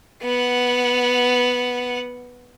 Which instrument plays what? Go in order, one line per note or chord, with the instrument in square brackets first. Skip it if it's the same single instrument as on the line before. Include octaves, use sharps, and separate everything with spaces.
[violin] B3 F#5